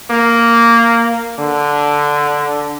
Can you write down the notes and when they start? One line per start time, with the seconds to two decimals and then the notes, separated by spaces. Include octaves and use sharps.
0.11 A#3
1.39 D3